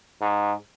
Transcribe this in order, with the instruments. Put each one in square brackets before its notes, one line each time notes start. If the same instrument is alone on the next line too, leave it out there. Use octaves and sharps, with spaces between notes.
[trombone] G#2